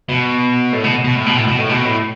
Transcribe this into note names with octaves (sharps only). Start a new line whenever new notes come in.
B2
A2
B2
B2
A2
B2
A2
B2
A2
B2
A2